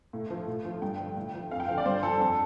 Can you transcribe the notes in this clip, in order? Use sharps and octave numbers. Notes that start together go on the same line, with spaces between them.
A2
F3
A2
F3
G2 G5
D3 F3
A2
F3
F2 F5
G5
D3 F3 F5
D5
G2 C5
F3 A4
F2 A4